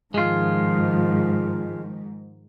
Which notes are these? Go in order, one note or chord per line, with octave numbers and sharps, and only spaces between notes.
G#2 D#3 F3 G#3 F4